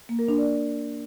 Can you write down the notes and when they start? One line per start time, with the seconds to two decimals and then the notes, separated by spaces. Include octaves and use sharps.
0.09 A#3
0.19 A#4
0.28 D4
0.38 D5